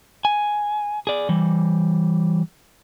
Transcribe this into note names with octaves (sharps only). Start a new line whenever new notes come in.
G#5
G#4 D5
E3 G3